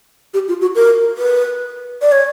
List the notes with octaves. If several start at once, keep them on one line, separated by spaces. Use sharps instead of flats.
G4
F4
F#4
A#4
B4
D5
C#5